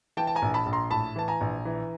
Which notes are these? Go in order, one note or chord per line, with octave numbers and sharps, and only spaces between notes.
E3 G5 A5
A5
G#5 A#5
A#1
A5 B5
A#1
A#5 C6
A2 A5 B5
E3 A5
G#5 A#5
A#1
E3